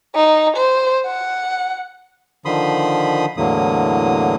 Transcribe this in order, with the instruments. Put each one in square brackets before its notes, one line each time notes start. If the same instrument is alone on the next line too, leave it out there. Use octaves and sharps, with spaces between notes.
[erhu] D#4
C5
F#5
[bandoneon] D3 D#3 F3 B5 C6 D#6
E2 A2 D3 F#3 A#3 D#6